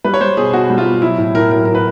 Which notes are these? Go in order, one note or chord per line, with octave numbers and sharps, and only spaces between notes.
G3 B4
C#5
G3 C5
B2 G#4
B2 F#4
G3
F4
B2
F#3 E4
A2
A2 A#4
F#3 A#4
A2 A#4
B4